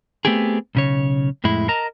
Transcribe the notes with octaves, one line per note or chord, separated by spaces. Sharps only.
A3 B3 C4 G4 G#4
B1 C#3 C#5
F2 A2 G#3 E4
A#4 D#5 A5 A#5